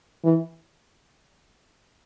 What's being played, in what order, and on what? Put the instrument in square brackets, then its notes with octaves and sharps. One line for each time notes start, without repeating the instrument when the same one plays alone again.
[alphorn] E3